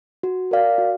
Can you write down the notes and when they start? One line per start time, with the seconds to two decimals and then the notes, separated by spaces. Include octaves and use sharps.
0.23 F#4
0.51 A#4 D5 F5
0.78 F#4